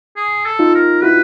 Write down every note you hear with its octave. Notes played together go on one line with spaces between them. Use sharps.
G#4
A4
D#4 F4
A#4
E4 F#4 B4